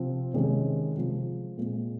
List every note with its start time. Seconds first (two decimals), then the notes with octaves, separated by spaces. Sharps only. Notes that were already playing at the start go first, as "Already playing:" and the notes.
Already playing: C3 F3 C4
0.34 C3 D#3 G#3 C#4
0.94 C3 F3 G#3
1.57 A#2 G#3 C4